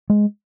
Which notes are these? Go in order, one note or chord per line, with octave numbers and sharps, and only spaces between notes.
G#3